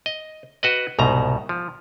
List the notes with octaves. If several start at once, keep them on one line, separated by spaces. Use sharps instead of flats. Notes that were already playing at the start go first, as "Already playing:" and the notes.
D#5
F#4 B4 D#5
C2 G#2 B2 A#5
F3